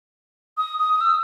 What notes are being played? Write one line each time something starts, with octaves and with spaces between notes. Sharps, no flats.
D#6
D#6
E6